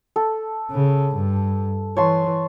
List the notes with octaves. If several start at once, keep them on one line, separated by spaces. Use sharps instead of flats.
A4
C#3
G2
E3 C#5 A5 C6